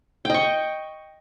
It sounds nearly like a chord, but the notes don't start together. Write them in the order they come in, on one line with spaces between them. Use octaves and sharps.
G5 D#5 C#6